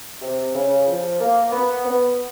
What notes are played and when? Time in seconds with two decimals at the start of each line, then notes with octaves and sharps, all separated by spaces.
0.22 C3
0.54 C#3
0.87 F3
1.20 A#3
1.52 B3
1.85 B3